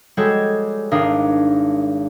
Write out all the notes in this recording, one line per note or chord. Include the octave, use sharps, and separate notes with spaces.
G3 G#3 F#4 G4 A4 C#5
G#1 D4 A#4 F5 D#6